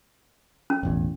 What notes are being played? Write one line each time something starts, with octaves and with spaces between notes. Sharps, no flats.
C#4
E1 A1 E2